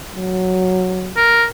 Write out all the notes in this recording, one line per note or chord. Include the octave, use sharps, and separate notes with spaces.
F#3
A#4